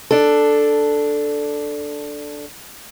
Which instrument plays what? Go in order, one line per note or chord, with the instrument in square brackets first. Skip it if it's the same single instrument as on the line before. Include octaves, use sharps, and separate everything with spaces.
[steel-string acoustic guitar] D4 A4